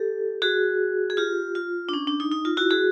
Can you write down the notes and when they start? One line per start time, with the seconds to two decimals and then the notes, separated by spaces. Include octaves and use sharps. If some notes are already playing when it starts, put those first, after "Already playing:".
Already playing: G4 A4
0.42 F#4 G#4
1.10 G#4
1.17 F4 G4
1.55 F4
1.89 D4
1.93 C#4
2.07 D4
2.20 D#4
2.32 D#4
2.45 F4
2.57 E4 F#4
2.70 F#4 G#4